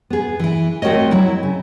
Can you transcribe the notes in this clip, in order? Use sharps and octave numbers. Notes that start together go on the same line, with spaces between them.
B3 G#4
E3 E4
A3 C4 F#4 A#4 C#5 D#5
F#3 E4
C#3